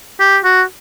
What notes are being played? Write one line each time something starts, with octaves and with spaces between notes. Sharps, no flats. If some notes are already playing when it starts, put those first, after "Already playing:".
G4
F#4